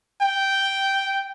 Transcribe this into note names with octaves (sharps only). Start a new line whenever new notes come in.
G5